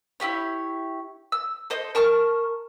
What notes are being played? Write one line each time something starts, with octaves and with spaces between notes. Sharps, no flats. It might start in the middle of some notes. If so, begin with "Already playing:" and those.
E4 F4 G4 C#5
E6
A4 C5 D#5
A#4 A5 C#6 F6